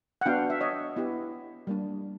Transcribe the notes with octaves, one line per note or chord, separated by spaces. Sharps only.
F#5
B3 D4 F#4 F5 G5
E5
C#5 D#5
B3 E4 G4
G3 A#3 D4